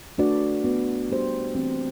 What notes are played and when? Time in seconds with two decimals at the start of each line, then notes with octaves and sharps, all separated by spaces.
0.18 A3 D4 F#4 B4 D5
0.64 B3 F#4 B4
1.09 G3 D4 G4 C5
1.55 E3 A3 C4